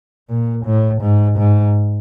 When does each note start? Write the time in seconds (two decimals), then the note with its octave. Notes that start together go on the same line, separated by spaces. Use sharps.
0.30 A#2
0.66 A2
1.02 G#2
1.39 G#2